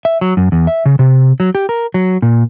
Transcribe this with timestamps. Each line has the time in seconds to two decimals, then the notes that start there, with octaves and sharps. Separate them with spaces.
0.05 E5
0.21 F#3
0.37 F#2
0.52 E2
0.67 E5
0.86 C#3
0.99 C3
1.40 F#3
1.55 G4
1.69 A#4
1.94 F#3
2.22 A#2